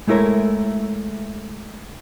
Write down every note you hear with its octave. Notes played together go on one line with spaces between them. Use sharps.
G#3 A3 E4 A#4 C#5